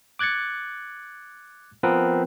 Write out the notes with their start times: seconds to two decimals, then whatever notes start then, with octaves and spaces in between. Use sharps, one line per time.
0.19 D6 F#6 G#6 A6 C#7
1.83 F3 B3 C4 A#4 B4